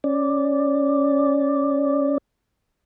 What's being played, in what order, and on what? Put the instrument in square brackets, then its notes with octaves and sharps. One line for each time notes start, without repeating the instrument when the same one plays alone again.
[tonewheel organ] C#4 D5